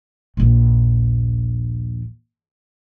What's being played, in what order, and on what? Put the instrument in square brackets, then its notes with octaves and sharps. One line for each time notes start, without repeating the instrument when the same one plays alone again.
[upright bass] A#1 D#2